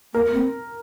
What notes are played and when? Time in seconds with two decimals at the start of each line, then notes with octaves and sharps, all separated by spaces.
0.13 A#3 A#4
0.24 A#3
0.33 C4